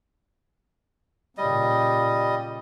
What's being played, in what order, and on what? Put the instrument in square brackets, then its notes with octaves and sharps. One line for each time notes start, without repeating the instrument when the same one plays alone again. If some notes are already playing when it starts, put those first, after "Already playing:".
[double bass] A#2 C#3 [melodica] G3 D#5